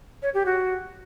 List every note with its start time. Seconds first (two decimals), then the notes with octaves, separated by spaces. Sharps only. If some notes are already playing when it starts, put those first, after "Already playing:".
0.22 C#5
0.34 G4
0.46 F#4